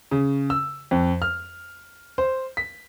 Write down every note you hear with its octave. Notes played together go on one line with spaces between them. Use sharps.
C#3
E6
F2
F6
C5
B6